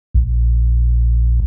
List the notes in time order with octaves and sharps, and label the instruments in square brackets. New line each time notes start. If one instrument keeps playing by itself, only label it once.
[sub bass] A#1